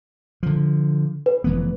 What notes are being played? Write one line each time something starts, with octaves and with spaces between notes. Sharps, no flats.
D3 F3
B4
F1 E3 B3